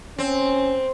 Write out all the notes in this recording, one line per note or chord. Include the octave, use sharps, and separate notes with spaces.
C4 C#4